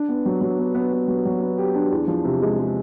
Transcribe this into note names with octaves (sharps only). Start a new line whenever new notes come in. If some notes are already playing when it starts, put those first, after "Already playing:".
Already playing: D4
B3
F#3
F#3
B3
B3
B3
F#3
F#3
B3
G4
D4
E2
F3
C3
G#3
G#3